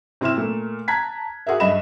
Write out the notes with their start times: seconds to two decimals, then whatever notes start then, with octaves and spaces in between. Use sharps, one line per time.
0.21 C3 E4 C6 F6 E7
0.37 A#2 A3 A#3
0.88 A5 A#5 F#6 G#6 B6
1.47 F#4 G#4 A#4 E5
1.60 G2 D#5 E5 B5 E7